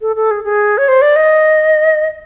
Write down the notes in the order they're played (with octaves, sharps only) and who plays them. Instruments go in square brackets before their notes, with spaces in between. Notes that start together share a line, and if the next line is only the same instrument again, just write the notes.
[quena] A4
A4
G#4
G#4
C#5
C5
D5
D#5